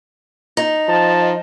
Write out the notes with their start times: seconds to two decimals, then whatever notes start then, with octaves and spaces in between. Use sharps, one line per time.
0.57 D#4
0.88 F3 A5